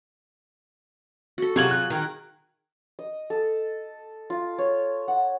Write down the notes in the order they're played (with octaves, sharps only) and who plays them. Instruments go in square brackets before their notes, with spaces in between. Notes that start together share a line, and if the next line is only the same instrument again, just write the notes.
[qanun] F#4 A4
[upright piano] C3 G#6 F#7 [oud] F#3 F4 F#4 [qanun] G#4
[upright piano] F#6
[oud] D#3 [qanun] A#4 A#5
[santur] D#5
A4
F4
C#5
F#5